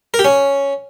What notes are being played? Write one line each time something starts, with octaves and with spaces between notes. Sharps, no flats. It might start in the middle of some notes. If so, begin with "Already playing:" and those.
A#4
G4
C#4